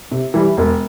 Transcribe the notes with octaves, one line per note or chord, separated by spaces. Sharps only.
C3
E3 G3
E1